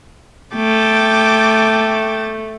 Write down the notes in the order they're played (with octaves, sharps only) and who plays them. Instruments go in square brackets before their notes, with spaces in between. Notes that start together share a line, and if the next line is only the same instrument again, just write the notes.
[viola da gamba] A3 [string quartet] G5 D6 A6